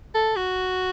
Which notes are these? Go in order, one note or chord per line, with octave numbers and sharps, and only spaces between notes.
A4
F#4